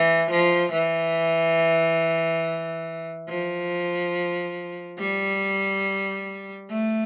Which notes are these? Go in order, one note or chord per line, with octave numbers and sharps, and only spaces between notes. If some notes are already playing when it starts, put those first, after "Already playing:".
Already playing: E3
F3
E3
F3
G3
A3